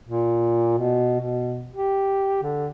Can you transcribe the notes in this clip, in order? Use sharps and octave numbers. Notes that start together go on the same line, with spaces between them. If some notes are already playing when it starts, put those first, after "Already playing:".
A#2
B2
B2
G4
D3